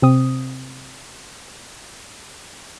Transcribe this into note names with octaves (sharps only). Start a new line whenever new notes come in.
C3 C4 D#6